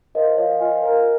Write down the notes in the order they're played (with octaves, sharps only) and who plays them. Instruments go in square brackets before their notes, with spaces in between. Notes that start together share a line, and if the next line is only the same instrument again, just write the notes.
[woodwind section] F3 [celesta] A#4 D#5
[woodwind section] F3 [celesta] C#5 F5
[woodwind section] F4 [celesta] D#5 G#5
[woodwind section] A#4